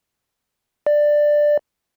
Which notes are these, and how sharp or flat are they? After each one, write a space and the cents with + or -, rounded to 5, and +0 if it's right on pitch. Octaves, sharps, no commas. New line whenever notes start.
D5 +10